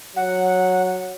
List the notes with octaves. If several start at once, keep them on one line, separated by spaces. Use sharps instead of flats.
F#3 F#5